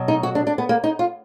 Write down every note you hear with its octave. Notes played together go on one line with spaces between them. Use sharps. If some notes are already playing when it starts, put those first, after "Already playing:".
Already playing: B2 F#3
D#4
F#4
D4
D4
B3
A#3
D#4
F4